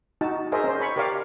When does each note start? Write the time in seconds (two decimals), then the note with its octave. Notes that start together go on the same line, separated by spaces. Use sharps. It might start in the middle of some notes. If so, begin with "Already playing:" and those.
0.21 D#4 F#4 A5
0.52 G#4 A#4 C5 D#5 E5
0.64 C#4 C5
0.80 C#5 B5 C#6
0.96 G4 A#4 C#5 D5 F5 D6